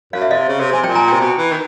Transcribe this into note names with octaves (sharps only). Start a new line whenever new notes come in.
F#2 F5
E5
C3 D#5 F5
C#3
C3
C3 G#5
A#2 G5 A5
G#5 A#5
C3 G5 A5
B2
E3
D#3